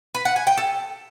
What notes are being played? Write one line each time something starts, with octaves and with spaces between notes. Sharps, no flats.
B4
F#5
G#5
G5
A4